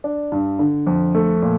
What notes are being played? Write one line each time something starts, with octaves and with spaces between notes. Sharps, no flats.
D4
G2
D3
F2
A3
A#2